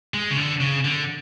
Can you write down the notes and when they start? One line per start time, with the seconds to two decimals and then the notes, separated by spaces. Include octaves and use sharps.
0.14 G#3
0.30 C#3
0.37 D3
0.61 C#3
0.85 D3